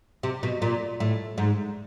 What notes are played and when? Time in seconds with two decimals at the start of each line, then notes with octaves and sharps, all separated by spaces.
0.23 C3
0.43 B2
0.62 A#2
1.00 A2
1.38 G#2